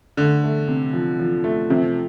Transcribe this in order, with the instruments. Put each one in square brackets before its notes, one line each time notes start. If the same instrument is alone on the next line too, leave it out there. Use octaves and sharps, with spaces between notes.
[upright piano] D3 [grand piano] A3
[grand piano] A3
C3
F3
F3
A3
[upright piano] C3 [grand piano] F3